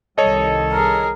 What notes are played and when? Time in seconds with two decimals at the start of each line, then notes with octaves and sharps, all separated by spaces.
0.18 C2 D#3 G3 A4 C#5 D#5
0.73 G#4 A#4